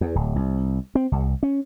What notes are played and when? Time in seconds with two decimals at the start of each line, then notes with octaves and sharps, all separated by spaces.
0.01 E2
0.15 D1
0.36 C2
0.95 C4
1.12 C2
1.43 C#4